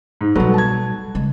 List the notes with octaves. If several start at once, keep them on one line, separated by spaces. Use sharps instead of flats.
G#2
B2 F#3 G3 A3 B3
A5 G#6
C#3 G#3